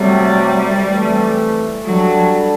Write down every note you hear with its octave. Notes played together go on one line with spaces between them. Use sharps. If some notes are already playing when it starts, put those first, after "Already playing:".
Already playing: C3 F#3 G3 A3
C3 E3 A3
F#3 G3 D4 A4